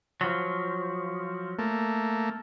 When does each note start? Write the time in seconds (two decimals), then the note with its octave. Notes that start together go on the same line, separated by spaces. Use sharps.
0.21 F3 F#3
1.59 A3 A#3